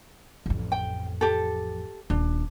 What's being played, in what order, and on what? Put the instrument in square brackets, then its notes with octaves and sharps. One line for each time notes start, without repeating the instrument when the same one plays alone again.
[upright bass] A1 F2
[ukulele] G5
G4 A4
[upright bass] D#1 [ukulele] D4